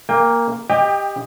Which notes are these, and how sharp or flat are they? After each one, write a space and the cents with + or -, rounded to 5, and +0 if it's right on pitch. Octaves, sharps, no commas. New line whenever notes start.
A#3 +0 G5 +40
G4 +15 D#5 +0 G5 +35